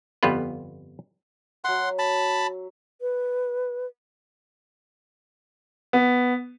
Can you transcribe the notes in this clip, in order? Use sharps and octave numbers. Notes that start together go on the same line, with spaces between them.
G1 F2 G3 B3 F4 B4
F#3 E5 F#5 C6
A5 B5
B4
B3